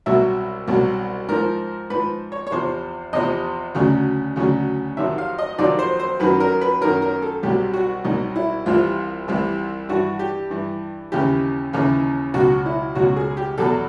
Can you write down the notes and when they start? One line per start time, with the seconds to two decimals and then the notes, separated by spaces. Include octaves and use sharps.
0.06 C2 B2 F#3 E5
0.68 C2 B2 F#3
1.29 G#2 F3 A#4
1.90 G#2 F3 B4
2.32 C#5
2.47 C#5
2.52 E2 C3 F3 C5
3.13 E2 C3 F3 D#5
3.75 D2 C#3 F#3
4.36 D2 C#3 F#3
4.97 F2 C3 D#3 F#3 E5
5.18 F5
5.38 D#5
5.59 F2 C3 D#3 F#3 D5
5.79 C5
5.99 C5
6.20 F#2 D#3 F#3 B4
6.40 A#4
6.61 B4
6.81 F#2 D#3 F#3 A#4
7.02 A#4
7.22 A4
7.43 C2 B2 F#3 G4
7.73 F#4
8.04 C2 B2 F#3 D#4
8.36 E4
8.66 C2 C3 E3 F4
9.28 C2 C3 E3
9.89 G2 E3 F#4
10.19 G4
10.50 G2 E3
11.12 D#2 C#3 E3 G4
11.73 D#2 C#3 E3
12.34 C#2 B2 F#3 F#4
12.66 E4
12.95 C#2 B2 F#3 F#4
13.16 G#4
13.37 G4
13.58 E2 B2 F#3 A4